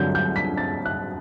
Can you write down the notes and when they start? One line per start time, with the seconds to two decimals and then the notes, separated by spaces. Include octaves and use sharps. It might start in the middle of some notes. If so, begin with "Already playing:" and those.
Already playing: G2 D3 F#3 G6
0.15 G6
0.36 B6
0.57 A6
0.85 F#6